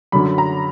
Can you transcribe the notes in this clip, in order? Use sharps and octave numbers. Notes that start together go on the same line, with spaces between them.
F#2 D3 F#3 B5
A#5